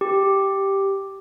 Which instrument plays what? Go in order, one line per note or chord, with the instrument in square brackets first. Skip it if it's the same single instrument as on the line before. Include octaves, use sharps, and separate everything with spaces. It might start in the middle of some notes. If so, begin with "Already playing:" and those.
[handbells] G4